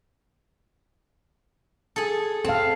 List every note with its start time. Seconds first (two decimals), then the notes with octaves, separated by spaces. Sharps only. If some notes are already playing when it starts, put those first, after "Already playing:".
1.96 G#4 A4
2.45 C4 A4 F5